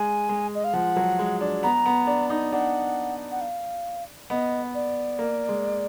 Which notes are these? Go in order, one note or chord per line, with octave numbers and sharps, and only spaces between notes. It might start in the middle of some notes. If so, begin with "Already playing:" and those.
Already playing: G#3 G#5
G#3
D#5
F5
F3 F#5
F#3
G#3
D4
B3 A#5
B3
D4
D#4
D4 F#5
F#5
F5
B3 D#5
D5
A#3
G#3